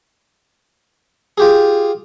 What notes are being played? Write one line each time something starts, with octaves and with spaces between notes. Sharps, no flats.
F4 G4 G#4